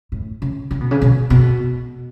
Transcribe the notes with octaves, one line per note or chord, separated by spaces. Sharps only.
A2
C#3
C#3
B2
C#3
B2
B2